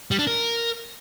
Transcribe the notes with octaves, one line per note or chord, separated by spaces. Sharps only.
G3
D4
A#4